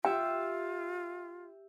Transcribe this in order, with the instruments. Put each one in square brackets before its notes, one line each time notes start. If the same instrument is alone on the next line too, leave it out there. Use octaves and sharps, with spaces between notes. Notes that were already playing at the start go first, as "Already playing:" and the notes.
[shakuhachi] F4 [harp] G4 E5 [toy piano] G5